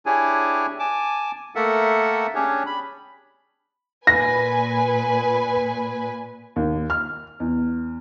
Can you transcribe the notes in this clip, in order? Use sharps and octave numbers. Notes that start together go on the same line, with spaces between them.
D4 E4 G4 G#4 C#5 G#5
G#5 A5 D6
A3 A#3 A4 A#4 E5 F#5
C#4 D4 G4 G#4 C#5
B5
A#2 B4 G#5 A#6
D#2
F6
E2